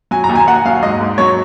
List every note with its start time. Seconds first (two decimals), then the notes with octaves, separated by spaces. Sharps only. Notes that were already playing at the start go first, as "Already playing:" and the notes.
0.11 F#3 G#5
0.24 A#5
0.29 D#2
0.35 G#5
0.47 D#2 F#5
0.65 F#3 F5
0.83 G#2 D#5
1.00 G#2
1.18 F#3 C#5